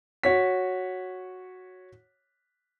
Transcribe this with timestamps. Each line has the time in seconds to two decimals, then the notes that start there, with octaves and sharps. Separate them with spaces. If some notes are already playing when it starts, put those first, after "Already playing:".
0.24 F#4 C#5 B6